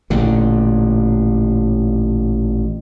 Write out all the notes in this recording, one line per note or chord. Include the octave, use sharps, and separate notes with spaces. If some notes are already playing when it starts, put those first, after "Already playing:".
A1 A#2 D3